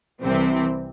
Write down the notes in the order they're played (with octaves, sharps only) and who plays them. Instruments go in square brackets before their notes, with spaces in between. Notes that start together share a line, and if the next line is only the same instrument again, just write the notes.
[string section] C2 C3 E3 C4